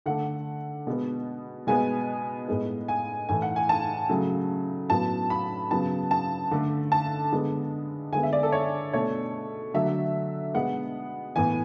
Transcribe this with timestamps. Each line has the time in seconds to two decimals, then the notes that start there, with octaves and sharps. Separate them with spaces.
0.06 D3 A3 F#5
0.87 B2 G#3 B3
1.67 B2 G#3 B3 G#5
2.48 A2 G#3 B3
2.88 G#5
3.29 A2 E3 A3 G#5
3.42 F#5
3.56 G#5
3.69 A5
4.09 C#3 F#3 A3
4.90 A2 F#3 B3 A5
5.30 B5
5.71 C#3 F#3 B3 A5
6.11 A5
6.51 D3 A3
6.92 A5
7.32 D3 G#3 B3
8.12 D3 G#3 B3 G#5
8.23 E5
8.33 D5
8.43 A4
8.52 C#5
8.93 B2 A3 C#5
9.74 D3 F#3 A3 E5
10.54 B2 G#3 B3 F#5
11.36 A2 E3 B3 G#5